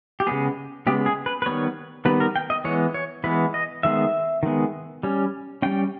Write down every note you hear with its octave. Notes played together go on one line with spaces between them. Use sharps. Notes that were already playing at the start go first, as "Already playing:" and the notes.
G4
C#3 G#3 B3 G#4
C#3 G#3 B3 G4
G#4
B4
B4
D#3 G3 B3 C#5
D#3 G3 B3 B4
A#4
G5
D#5
E3 G#3 B3 C#5
C#5
E3 G#3 B3 B4
D#5
D#3 G#3 B3 E5
D#3 G#3 B3
G3 C#4
G3 C#4 G5